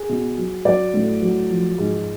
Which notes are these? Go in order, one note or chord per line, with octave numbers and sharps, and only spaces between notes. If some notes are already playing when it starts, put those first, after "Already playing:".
Already playing: G#4
B2
F#3
F#3 D5
A2
F#3
F3
G#2